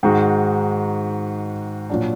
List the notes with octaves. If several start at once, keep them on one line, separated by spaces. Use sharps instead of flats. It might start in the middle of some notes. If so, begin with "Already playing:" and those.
G#2 D#3 G#3 D#4 F#4
A#2 F#3 D4